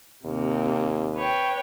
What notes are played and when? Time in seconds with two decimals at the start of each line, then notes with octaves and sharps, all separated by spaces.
0.25 D#2 C3 A#3
1.15 B4 C#5 G5